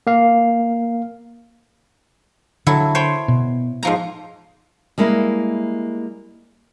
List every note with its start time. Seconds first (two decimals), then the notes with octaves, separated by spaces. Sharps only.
0.07 A#3 F5
2.67 D3 F#3 E4 A4
2.95 C5 C#5 G5
3.28 B2
3.83 G#2 F3 A#5
4.98 G3 G#3 A#3 E4